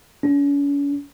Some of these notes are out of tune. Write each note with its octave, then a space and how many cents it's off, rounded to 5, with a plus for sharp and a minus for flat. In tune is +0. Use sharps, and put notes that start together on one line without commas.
C#4 +40